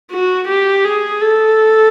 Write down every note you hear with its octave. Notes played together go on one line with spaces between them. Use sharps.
F#4
G4
G#4
A4